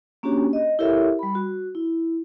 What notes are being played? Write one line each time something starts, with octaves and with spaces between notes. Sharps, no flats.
A#3 C#4 D4 F#4 G4 C#5
D#5
E4 G4 A4 A#4 C#5 E5
G3 B5
F#4
E4